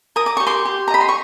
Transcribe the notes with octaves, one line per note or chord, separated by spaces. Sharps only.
A#4 D#6
D6
G4 C#6
C6 D6
G4
A#5
D#5 B5
C6
C#6